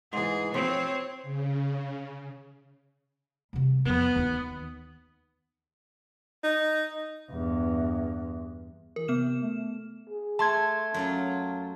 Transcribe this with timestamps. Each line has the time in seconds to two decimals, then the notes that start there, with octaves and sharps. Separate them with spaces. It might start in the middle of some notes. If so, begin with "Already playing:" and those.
0.13 G#2 E3 G#4
0.54 F3 C4 C#5
1.23 C#3
3.53 C3 G3
3.85 F2 F3 B3
4.16 D#2 D#3
6.44 D#4
7.31 E2 G2
8.96 E3 A#4
9.08 C3 B3 F6 E7
9.42 A3
10.09 G#4
10.39 A3 A5 C6 G#6
10.94 F#2 F#3 C#4 F4